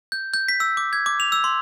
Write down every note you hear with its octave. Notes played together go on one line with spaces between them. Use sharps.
G6
G6
B6
E6
D6
G#6
D6
F7
E6
C6